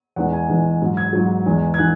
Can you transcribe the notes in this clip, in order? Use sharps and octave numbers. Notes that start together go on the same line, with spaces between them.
E2 E3 G#3 F#5
G#5
E2 E3 G#3
G#2 F#3
G#6
G#2 F#3
E2 E3 G#3
G#6
E3 F#6